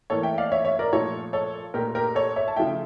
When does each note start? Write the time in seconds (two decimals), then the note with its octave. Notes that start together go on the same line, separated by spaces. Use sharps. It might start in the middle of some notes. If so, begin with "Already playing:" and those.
0.10 A2 E3 A#3 A4 C#5
0.23 E5 G5
0.38 D5 F5
0.52 C#5 E5
0.65 C#5 E5
0.79 A#4 D5
0.92 A#2 F3 A3 A4 C#5
1.33 A4 C#5
1.74 A#2 A3 G4 A#4
1.95 G4 A#4
2.15 A4 C#5
2.36 C#5 E5
2.48 A5
2.56 C#3 F3 A3 E5 G5